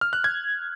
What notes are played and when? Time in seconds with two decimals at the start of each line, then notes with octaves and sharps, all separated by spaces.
0.01 F6
0.13 F#6
0.24 G#6